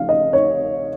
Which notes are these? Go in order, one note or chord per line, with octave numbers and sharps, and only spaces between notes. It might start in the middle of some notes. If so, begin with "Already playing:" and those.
Already playing: C#3 F3 F5
D#5
C#5